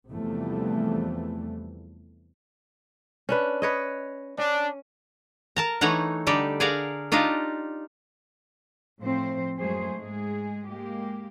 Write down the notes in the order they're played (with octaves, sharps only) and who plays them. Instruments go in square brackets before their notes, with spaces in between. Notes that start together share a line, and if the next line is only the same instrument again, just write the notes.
[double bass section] E2 C3 E3 F3 G3 A3
[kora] C#4 D4 B4
B4 C#5 D#5
[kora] C#4 [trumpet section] D4
[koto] A#4 A5 A#5
E3 A3 D#4 C#5 F#5 A#5
D3 G3 D#4 G4 D5
G#4 A#4 D5 F5 F#5 A#5
D4 D#4 F4 G4 D#5 F5
[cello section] A2 F3 C4 C5
F#2 G#3 A3 G#4 C5
G#2 G#3 G#4
G#3 A#3 G4